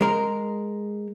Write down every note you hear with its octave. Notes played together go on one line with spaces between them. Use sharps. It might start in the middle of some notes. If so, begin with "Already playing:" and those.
G#3 A#4